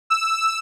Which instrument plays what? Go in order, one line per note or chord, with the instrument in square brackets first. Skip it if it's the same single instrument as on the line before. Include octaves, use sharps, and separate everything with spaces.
[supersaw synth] E6